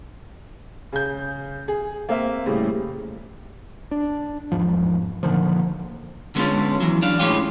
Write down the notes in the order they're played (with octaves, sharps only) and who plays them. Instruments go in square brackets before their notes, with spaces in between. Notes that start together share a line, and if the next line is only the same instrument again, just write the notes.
[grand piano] C#3 G6
G#4
A#3 C4 E5
A2 C#3 G3
[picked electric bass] D4
E2 G#2 F3
A#2 D3 D#3 F3
[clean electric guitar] D3 G#3 A#3 B3 C#4 F4
E3 F#3
D4 F5
A2 G#3 C#4 F4 G4